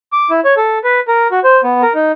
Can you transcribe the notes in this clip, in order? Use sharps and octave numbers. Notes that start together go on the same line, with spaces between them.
D6
E4
C#5
A4
B4
A#4
F#4
C5
B3
A#4
D#4